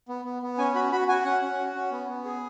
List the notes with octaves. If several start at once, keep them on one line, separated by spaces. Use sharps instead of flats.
B3
B3
B3
C#4 G#5
F#4 B5
F#4 B5
F#4 G#5
C#4 F#5
C#4
F#4
C#4
B3
B3
G#4